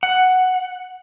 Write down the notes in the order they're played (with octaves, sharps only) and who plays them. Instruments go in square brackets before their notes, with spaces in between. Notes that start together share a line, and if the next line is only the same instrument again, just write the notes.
[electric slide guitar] F#5